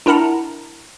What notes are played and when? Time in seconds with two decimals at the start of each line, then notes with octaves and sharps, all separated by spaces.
0.06 D4 E4 A#4 F#5 A5 A#5